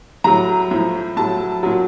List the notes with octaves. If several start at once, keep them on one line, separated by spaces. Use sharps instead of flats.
A2 F#3 A#5
A2 F3
A2 F#3 A5
A#2 F#3